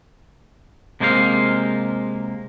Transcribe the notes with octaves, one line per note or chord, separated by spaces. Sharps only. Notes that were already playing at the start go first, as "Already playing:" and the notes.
C3 G#3 A#3 C5 D5 F5